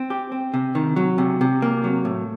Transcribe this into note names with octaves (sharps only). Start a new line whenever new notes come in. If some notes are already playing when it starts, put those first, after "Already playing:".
Already playing: C4
G4
C4
C3
D#3
F#3
C3
C3
A#3
F#3
A2